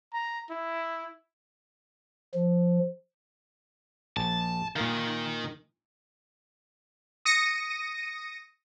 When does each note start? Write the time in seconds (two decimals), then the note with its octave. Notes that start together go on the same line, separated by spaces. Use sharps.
0.13 A#5
0.50 E4
2.35 F3
4.17 A#1 A5
4.76 A#2 D#3 A#4 F5
7.25 D#6 A#6 C#7 D#7